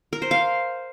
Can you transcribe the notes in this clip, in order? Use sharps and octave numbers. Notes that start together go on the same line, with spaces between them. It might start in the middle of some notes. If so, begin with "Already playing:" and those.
A#4
C5
F5